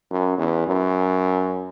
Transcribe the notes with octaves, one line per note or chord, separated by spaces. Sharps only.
F#2
E2
F#2